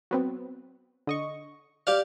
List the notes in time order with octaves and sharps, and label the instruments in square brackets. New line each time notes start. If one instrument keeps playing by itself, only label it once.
[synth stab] F#3 B3 C4
D3 D#5 C#6
[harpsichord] G4 D5 F5 [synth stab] F6